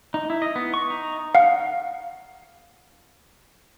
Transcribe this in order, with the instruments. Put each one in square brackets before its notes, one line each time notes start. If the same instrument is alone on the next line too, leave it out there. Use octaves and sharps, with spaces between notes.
[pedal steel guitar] D#4
E4
D#5
B3
C#6
D#4
[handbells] F5 F#5